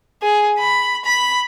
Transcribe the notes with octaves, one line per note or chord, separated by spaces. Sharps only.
G#4
B5
B5